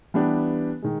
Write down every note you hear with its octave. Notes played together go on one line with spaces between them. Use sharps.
E3 G3 B3 D4 G4
D#3 G#3